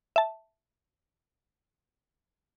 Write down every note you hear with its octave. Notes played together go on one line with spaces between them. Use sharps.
E5 A5